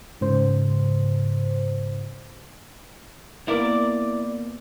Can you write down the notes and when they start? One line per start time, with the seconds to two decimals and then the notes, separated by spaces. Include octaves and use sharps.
0.21 G#2 C#3 C5
3.48 A#3 B3 E4 A#4 D5